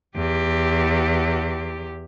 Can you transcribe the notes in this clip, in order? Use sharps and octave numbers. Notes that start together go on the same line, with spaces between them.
E2 G4